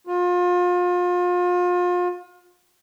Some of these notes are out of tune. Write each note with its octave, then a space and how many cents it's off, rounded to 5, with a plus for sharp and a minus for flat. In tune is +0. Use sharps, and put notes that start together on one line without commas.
F4 +35